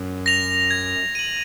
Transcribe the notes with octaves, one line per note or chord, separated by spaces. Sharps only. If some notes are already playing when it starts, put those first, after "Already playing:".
Already playing: F#2
A#6 F7
G#6
D#7 F#7